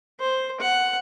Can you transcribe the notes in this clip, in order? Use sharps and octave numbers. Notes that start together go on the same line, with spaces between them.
C5
F#5